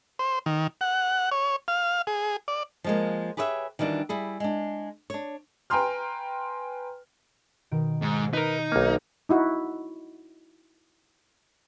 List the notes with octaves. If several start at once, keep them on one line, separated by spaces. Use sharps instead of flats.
C5
D#3
F#5
C#5
F5
G#4
D5
F3 G#3 A#3
G4 G#4 B4 C#5 D#5 E5
D#3 E3 G3 D4 F#4
G3 E4 G#4
G#3 D4
D4 C#5
B4 G5 G#5 A#5 C6 F6
B2 D#3 D7
G#2
D#4 A#4 B4 D#6
B1 A#3
D#4 E4 F#4